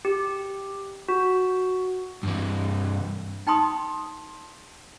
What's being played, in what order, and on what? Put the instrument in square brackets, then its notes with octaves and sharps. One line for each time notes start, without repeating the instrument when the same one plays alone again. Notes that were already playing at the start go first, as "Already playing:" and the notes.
[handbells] G4
F#4
[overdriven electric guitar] G2 E3
[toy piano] D#4 G5 A5 B5 C6 D#6